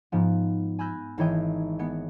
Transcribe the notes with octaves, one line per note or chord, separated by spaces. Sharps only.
G#2 F3 B3
G#5 B5 E6 F#6 G6 A#6
G#1 E3 E4 C#5 D#5 G5
G#3 B3 C#7